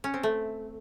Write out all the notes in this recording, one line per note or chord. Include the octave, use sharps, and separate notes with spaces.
C#4
C4
A3